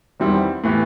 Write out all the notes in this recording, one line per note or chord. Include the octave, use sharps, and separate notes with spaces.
E2 D#3 G3 C4 E4
A2 E3 B3 E4 G4